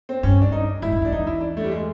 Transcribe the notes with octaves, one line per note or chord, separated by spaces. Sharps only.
C4
G2 C#4
D4
D#4
G#2 E4
F#2
F2
D4
E2 D#4
E4
D4
A3
G3
G#3